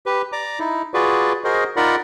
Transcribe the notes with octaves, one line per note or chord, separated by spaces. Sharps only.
G4 B4
D5 A#5 D6
D#4 E4
F4 F#4 G#4 B4 D5
F#4 G#4 A#4 C5 D#5
D#4 F4 A#4 D5 F#5 B5